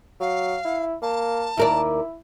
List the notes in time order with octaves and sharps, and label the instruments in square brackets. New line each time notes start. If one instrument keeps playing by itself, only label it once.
[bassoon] F#3 [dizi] F5
[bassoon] E4
[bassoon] A#3 [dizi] A5
[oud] D#2 A#4 D5 [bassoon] E4